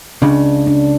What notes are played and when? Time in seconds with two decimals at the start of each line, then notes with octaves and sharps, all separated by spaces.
0.22 C#2 C#3 D4
0.67 D4